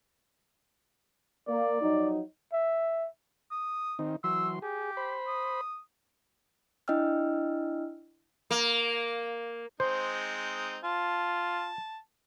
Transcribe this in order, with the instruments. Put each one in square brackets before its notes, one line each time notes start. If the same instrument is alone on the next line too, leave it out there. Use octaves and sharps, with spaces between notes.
[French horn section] A#3 [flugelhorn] D5
[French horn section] F3 F#3 D#4
[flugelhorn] E5
[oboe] D#6
[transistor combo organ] D#3 C4 D#4
[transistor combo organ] E3 F#3 C6 [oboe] E6
[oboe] G4 [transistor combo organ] G#4
[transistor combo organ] C5 B5
[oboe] D#6
[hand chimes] D4 E4 D#5 G5 E6 F6
[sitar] A#3
[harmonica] G#3 C4 D#4 [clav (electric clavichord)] C5
[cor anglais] F4 [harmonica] A5